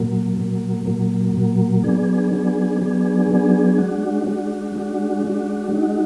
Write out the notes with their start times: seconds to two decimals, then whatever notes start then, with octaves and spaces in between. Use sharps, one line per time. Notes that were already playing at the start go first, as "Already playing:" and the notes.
Already playing: A#2 F#3 A#3
0.37 A#2 F#3 A#3
0.86 A#2 F#3 A#3
1.34 A#2 F#3 A#3
1.83 F#3 B3 D4 G#4
2.32 F#3 B3 D4 G#4
2.81 F#3 B3 D4 G#4
3.30 F#3 B3 D4 G#4
3.78 G#3 D4 F#4
4.27 G#3 D4 F#4
4.76 G#3 D4 F#4
5.24 G#3 D4 F#4
5.72 G#3 D#4 F#4